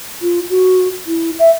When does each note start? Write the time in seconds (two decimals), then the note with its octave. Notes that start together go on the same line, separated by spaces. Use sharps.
0.21 F4
0.50 F#4
1.07 E4
1.39 E5